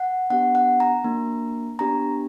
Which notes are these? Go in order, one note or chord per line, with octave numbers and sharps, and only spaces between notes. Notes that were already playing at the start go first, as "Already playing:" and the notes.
Already playing: F#5
B3 D4 G4 F#5
F#5
A#5
A#3 D4 F#4
B3 D4 G4 A#5